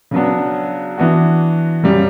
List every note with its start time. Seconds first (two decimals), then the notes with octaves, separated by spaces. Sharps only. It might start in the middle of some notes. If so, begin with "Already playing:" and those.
0.11 C#3 F#3 B3 D4
0.98 E3 B3 D4 F#4
1.83 F#2 C#3 G3